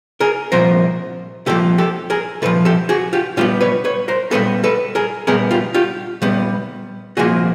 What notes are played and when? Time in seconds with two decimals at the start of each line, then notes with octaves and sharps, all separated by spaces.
0.20 G#4 A#4
0.52 C2 A#2 F3 A#4 C5
1.46 C2 A#2 F3 G4 A4
1.78 G4 A4
2.10 G#4 A#4
2.42 C2 A#2 F3 A4 B4
2.65 G4 A4
2.89 F#4 G#4
3.13 F4 G4
3.37 A#2 G3 B3 F4 G4
3.61 B4 C#5
3.85 B4 C#5
4.08 A#4 C5
4.31 A#2 G3 B3 A4 B4
4.64 A4 B4
4.95 G#4 A#4
5.27 A#2 G3 B3 G#4 A#4
5.51 F4 G4
5.74 F4 G4
6.22 A#2 G3 B3
7.17 C2 A#2 F3 A#3 F#4 G#4